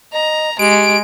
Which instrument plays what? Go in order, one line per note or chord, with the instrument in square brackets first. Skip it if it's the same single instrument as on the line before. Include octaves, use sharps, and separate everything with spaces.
[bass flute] D#5 [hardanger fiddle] A#5
[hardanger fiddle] G#3 [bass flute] G4 [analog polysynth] D7